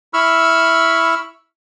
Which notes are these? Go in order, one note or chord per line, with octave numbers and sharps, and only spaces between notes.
E4 B5 C#6 E6 F6